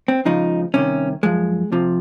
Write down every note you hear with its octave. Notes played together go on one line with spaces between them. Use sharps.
C4
C#2 C#3 F3 D#4
C2 C3 D#3 C#4
F#2 F3 G#3
F2 C3 F3